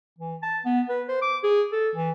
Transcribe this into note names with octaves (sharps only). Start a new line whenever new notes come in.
E3
A5
B3
B4
C5
D6
G#4
A4
E3